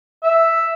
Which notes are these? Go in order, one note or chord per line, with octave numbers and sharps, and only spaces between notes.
E5